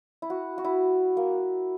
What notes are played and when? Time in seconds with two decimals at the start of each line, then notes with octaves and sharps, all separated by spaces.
0.22 E4
0.30 F#4
0.58 F#4
0.64 E4
1.17 A#3